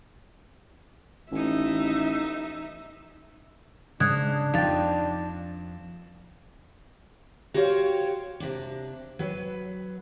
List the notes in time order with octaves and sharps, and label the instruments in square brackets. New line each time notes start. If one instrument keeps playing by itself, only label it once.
[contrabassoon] A1 [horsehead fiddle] D#4 E5
[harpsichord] G#2 [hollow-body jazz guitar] C#3 [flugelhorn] D4 [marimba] D#6 F#6 G#6
[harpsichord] F2 [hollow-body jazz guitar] D#4 G5 [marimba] F5 A6
[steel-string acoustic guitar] F#4 G4 C5 C#5 F5
C3 D4
F#3 B4